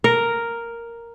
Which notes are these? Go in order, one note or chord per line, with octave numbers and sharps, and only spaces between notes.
A#4